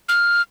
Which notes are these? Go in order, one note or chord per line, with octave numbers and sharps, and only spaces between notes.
F6